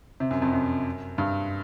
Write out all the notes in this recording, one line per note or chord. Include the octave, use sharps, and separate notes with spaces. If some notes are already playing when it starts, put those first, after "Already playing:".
C3
F#2
F2
F#2
G2